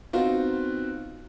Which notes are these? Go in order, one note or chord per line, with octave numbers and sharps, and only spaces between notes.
B3 C4 D#4 F4 F#4